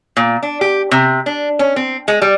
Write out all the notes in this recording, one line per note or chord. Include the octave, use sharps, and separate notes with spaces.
A#2
D4
G4
C3
D4
C#4
C4
G#3
G3